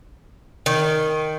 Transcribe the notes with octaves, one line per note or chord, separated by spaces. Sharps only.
D#3